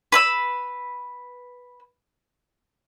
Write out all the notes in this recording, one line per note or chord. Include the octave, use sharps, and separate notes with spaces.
B4 B5 E6